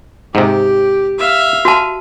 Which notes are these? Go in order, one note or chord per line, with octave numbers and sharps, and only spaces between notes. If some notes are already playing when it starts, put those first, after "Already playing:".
G#2 C3 G4
E5 F5
F#4 A5